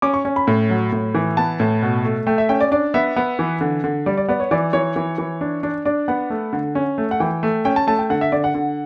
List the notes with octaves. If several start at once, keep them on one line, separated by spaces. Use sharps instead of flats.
C#4 D6
C#6
C#4
B5
A2
F#3
A2
E3
B3 A5
A2
B2
A3
A3 G5
E5
C#4 G5
D5
D4 D5
B3 E5
B3
E3
D3
D3
G3 D5
D5
B3 D5
C#5
E3 D5
E3 C#5
E3
E3
D4
D4
D4 D5
B3 F#5
A3
D3
C#4
A3
F#5
E3 G5
A3
C#4 G5
A5
A3 A5
G5
D3 F#5
E5
D3 D5
F#5
D3